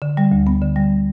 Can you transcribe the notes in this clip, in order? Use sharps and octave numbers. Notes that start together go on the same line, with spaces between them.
D3
G3
D2
B3
D3
G3